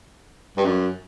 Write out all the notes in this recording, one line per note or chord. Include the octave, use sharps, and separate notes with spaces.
G2
F#2